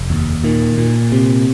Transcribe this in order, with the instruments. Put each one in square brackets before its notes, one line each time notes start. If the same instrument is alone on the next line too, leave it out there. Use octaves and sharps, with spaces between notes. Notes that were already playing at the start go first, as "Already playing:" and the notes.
Already playing: [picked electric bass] F1
D#2
A#2 D#3
A#2
C3